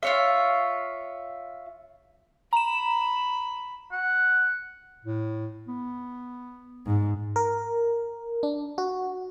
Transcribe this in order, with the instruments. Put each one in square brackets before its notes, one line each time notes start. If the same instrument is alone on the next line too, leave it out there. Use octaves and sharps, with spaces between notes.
[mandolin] F4 C#5 E5
[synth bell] A#5 E7 [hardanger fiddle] B5
[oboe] F#5
[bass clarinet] A2
B3
[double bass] G#2
[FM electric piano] A#4
D4
F#4